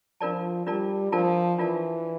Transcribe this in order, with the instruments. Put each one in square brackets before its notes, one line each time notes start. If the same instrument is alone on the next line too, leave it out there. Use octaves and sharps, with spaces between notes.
[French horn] F3 [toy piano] D4 F4 A#4 D5 A5
[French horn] G3 [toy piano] D4 F4 A#4 D5 A5
[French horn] F3 [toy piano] D4 F4 A#4 D5 A5
[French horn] E3 [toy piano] D4 F4 A#4 D5 A5